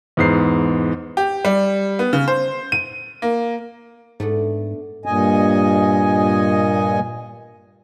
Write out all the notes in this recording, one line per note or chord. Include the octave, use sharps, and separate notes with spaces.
E2 G#2 C7
G4
G3
B3
C#3
C5
D#7
A#3
G#2 A3 B3 D4
G2 A#2 D#5 G#5